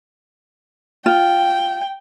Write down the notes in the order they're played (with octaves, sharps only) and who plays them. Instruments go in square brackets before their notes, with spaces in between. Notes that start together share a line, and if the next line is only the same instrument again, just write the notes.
[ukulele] F4 [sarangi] G5